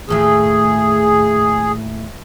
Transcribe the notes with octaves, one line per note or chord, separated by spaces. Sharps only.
D#2 A2 A3 G#4